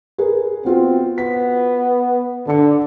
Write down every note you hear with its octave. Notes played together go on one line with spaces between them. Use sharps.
G#4 A#4 B4
B3 C4 F4 F#4
B3 B6
D3 D4 C#7